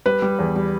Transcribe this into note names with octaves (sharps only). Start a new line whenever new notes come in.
G3 B4
G3
E2
G3